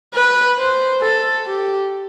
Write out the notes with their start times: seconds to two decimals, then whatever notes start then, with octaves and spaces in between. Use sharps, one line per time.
0.14 B4
0.58 C5
1.02 A4
1.46 G4